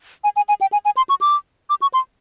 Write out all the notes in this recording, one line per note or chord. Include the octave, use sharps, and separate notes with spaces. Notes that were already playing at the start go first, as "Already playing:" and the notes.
G#5
G#5
G#5
G5
G#5
G#5
C6
C#6
D6
D6
C#6
C6